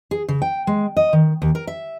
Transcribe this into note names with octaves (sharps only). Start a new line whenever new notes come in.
G#4
C#3
G5
G#3
D#5
D#3
D#2
A#4
E5